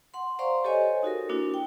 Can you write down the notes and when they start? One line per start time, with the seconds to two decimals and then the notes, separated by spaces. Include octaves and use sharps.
0.14 F#5 C6
0.39 C5 D5 F5 A#5 C6 C#6
0.64 G4 A4 C5 C#5 D#5 G#5
1.03 D#4 F#4 A4 A#4
1.29 A#3 D4 E4 F#4
1.54 G5